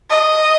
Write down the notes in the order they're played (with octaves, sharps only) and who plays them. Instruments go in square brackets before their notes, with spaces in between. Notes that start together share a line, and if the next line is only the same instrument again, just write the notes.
[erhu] D#5